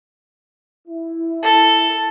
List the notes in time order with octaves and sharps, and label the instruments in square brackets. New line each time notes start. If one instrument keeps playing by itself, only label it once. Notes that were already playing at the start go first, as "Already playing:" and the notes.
[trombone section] E4
[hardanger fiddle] A4